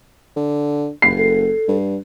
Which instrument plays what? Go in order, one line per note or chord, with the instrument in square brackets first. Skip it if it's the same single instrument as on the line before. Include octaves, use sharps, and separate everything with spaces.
[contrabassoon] D3
[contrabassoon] F#1 [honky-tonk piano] C7
[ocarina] A4
[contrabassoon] G2